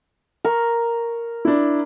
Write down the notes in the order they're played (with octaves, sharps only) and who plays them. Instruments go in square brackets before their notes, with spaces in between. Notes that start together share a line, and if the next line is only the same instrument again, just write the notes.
[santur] A#4 C#6
[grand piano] D4 E4